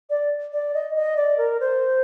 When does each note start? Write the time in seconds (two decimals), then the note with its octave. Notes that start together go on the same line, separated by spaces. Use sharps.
0.10 D5
0.53 D5
0.74 D#5
0.95 D#5
1.17 D5
1.38 A#4
1.60 C5